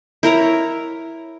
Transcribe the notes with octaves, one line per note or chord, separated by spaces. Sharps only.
E4 A#4 C#5 A#5